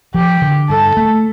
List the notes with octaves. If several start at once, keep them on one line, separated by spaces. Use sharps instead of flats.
F3 G4
D3
G2 A4
A3